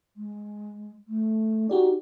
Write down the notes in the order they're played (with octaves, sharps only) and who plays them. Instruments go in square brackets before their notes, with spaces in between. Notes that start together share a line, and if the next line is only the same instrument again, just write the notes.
[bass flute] G#3
A3
[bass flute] D#4 [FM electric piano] F#4 G4 D5